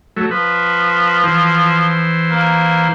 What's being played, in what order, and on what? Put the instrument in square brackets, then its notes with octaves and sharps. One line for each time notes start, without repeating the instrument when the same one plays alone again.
[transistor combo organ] F#3 A3
[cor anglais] F3 [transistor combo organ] B4
[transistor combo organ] E3 C5
[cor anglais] A#3